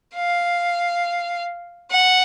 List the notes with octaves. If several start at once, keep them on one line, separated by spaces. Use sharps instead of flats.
F5
F#5